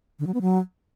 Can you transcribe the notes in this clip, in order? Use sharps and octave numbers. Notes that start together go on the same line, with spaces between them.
D3
F#3
B3
F#3